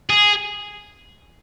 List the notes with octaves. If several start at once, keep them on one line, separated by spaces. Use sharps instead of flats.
G#4